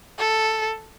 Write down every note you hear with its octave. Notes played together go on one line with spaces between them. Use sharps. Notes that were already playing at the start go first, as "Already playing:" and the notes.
A4